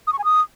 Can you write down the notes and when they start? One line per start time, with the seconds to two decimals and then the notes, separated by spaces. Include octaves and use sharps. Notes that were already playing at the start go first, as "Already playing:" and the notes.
0.07 D#6
0.13 C#6
0.19 G#5
0.24 D#6